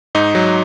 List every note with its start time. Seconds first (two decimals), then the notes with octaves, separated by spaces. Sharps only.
0.15 G#2 D#4
0.35 F#3